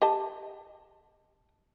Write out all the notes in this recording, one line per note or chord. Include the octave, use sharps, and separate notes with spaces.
G4 D#5 A5